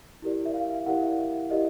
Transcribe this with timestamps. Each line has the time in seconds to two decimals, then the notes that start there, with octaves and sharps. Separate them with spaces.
0.22 E4 G4 A#4 D5
0.45 E5
0.54 F5
0.74 F5
0.86 E4 G4 A#4 D5 F#5
1.02 E5
1.19 E5
1.34 E5
1.50 E4 G4 A#4 D5 D#5